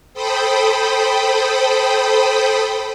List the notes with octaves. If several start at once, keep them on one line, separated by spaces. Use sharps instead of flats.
A4 C5 G5 B5 D#6